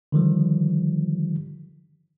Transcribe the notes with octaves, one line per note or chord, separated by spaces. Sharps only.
D3 D#3 F3 G3